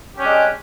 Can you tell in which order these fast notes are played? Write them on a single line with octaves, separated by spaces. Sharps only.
G4 C#4 D4 G#3